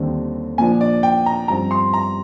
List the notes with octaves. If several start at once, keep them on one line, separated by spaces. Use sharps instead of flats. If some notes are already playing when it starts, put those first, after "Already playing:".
Already playing: D#2 D3 G3 C4
A#2 F3 A#3 D4 G#5
D5
G5
A#5
G2 F3 C4 A#5
C6
A#5